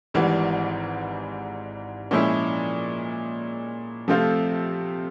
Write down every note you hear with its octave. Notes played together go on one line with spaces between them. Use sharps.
G#1 G#2 E3 G3
A#2 F3 G#3 C#4 E4
C3 F3 A3 C4 F4